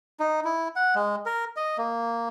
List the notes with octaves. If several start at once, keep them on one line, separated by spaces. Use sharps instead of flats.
D#4
E4
F#5
G#3
A#4
D#5
A#3